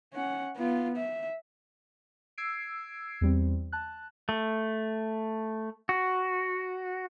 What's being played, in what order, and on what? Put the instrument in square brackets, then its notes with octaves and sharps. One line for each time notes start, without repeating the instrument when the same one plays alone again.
[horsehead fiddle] C#4 F#5
B3 F4
E5
[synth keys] E6 G#6 C7 D7
E2 G3 C4
A5 F#6
[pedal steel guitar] A3
F#4